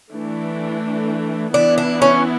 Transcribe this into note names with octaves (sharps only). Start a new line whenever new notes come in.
E3 A3 D4
E3 B3 D4 E4
D4
C#4